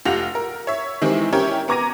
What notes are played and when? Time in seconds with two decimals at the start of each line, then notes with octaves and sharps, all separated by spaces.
0.05 F1 F4 G4 F#5 A#6 F7
0.35 A#4
0.67 C#5 E5
1.02 D#3 E3 G#3 C4 E4 G4
1.33 C#4 E4 G4 A#4 C#5 G5
1.68 B3 A#5 D6 G#6 A#6 D#7